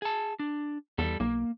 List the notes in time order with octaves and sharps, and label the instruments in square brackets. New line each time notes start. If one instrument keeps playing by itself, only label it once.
[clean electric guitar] G#4 A5
D4
[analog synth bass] E2 [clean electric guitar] G3 A4
[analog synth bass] B1 [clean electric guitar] A#3